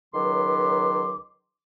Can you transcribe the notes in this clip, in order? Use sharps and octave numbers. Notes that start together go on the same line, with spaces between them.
C#2 D#3 F#3 B4 C6 D6